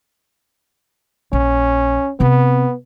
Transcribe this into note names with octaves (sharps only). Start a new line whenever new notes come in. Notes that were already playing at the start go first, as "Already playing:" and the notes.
A#1 C#4
C3 B3 C4